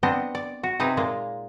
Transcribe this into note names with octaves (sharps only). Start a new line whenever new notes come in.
B3 C4 D4 D#5
D5
F#4
C3 D#4 G#4 B4 A#5
A#2 G#3 A#3 F4